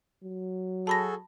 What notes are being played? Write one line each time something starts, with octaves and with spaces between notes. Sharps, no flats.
F#3
F#4 G#4 A4 A5 B5 A#6